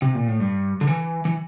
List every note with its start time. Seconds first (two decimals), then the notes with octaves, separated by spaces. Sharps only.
0.02 C3
0.15 A#2
0.28 A2
0.40 G2
0.81 D3
0.87 E3
1.25 E3